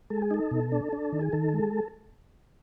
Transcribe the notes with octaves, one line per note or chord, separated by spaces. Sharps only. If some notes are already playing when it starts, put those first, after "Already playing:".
G#3 A4
G#4
D#4 A4
B2
D4
D4
D#3
G#4
D#3 A4
G#3